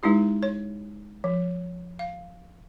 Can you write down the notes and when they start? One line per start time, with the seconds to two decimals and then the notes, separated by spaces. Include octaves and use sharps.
0.03 G#3 D#4 E4 G4
0.43 C#5
1.24 F3
1.99 F5